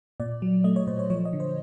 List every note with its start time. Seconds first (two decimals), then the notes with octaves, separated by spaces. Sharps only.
0.20 A#2 D5
0.42 F#3
0.64 A3 D#5
0.76 C#5
0.87 A#2 C5
0.99 C#5
1.10 F3 C#5
1.25 D#5
1.33 D3
1.40 C5